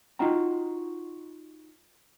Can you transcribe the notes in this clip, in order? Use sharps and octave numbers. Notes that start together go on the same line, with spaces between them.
D#4 F4 F#4 G5 A#5